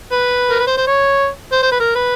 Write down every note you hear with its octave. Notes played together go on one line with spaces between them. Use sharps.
B4
A#4
B4
C5
C5
C#5
C5
C5
B4
A#4
B4